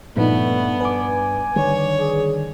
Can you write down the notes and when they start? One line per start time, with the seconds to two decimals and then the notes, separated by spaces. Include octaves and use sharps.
0.16 G2 A#2 F3 A3 B3 D#4
0.81 B4 G#5 D6
1.56 D3 D#3 G3 C#5
1.99 G#4